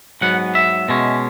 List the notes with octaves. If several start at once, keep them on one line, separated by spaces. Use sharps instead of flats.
G#2 F#3 B3 F#5
E5
B2 G#3 C#4